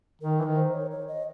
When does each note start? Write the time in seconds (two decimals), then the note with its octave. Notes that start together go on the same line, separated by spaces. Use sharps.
0.22 D#3 A#4
0.38 E3 A#4
0.44 D#3
0.56 C5
0.73 C#5
0.91 C#5
1.08 D#5